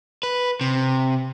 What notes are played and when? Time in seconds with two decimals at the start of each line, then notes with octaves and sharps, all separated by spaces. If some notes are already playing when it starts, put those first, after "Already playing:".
0.23 B4
0.61 C3